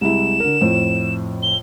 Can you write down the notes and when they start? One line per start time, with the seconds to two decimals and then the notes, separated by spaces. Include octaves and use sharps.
0.01 C2 G#3 E4 E7
0.40 D3 A#4
0.61 F2 A2 C5
1.43 G7